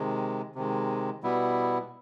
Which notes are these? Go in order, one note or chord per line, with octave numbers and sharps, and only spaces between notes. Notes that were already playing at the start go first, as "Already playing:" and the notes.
Already playing: C3 D#3 G#3
C3 D#3 G#3
B2 G3 B3 E4